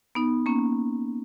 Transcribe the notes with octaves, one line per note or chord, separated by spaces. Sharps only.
B3 D#4
A#3 C#4